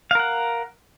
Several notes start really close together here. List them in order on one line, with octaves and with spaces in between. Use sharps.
F5 A#4 F#5